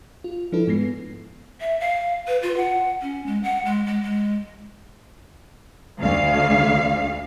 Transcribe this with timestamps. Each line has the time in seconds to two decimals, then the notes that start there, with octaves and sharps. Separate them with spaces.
0.24 F4
0.52 F3 D4 E4 F4 A4 B4
0.67 G#2 G#3 B3 A#6 C7
1.61 E5
1.80 F5
2.28 B4
2.43 F4
2.57 F#5
3.02 C#4
3.26 G#3
3.43 F#5
3.66 G#3
3.86 G#3
4.03 G#3
6.01 D2 F5